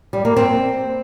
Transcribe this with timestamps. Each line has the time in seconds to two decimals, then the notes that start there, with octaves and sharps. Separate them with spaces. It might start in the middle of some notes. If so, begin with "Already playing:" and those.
0.13 G3
0.25 A#3
0.37 C4